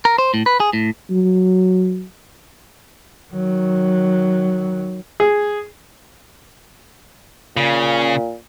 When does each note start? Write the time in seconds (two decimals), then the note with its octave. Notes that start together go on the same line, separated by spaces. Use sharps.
0.05 A#4
0.18 C5
0.34 A2
0.46 B4
0.60 G#4
0.73 A2
1.10 F#3
3.33 D#3 F#3
5.20 G#4
7.57 A#2 C#3